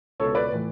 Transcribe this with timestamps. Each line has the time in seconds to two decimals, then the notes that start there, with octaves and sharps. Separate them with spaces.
0.20 C#2 B2 A4 C#5
0.35 B4 D5
0.52 A2 E3